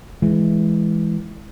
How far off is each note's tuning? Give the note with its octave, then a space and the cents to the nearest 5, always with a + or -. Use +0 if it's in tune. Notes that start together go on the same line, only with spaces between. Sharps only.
E3 +0 G#3 +5